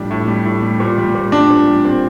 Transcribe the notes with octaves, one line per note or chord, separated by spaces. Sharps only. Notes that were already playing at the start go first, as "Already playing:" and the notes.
Already playing: A2 F3 G3 D4
A2
G3
A2
G3
A#2
G3
A#2
G3 D4
A#2
G3
A#2 C4